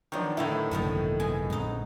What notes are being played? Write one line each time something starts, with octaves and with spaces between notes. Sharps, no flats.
D#3 F3 F#3 B3 D4
A2 D3 D#3 D#4 E4
G#1 F#2 D#3 F3 A3
B2 G#3 G#5
A#1 A#2 G#3 D#4 F#4